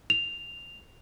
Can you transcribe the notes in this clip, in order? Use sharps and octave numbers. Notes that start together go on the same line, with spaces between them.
F7